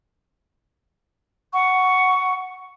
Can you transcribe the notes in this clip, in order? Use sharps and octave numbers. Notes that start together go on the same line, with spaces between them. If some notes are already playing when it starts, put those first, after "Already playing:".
F#5 C#6